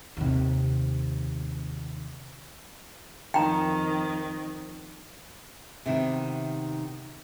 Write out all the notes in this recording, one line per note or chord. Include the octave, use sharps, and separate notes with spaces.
D#2 C3
F2 D#3 G5 A#5
C3 D#3 B3